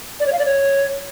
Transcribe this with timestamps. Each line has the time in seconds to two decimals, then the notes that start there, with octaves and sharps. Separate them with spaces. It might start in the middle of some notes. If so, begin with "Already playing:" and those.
0.20 D5
0.26 C#5
0.33 F5
0.39 D5
0.45 C#5